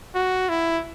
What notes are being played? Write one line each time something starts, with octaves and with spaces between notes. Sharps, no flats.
F#4
E4